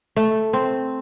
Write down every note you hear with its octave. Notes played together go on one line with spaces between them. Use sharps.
A3
C4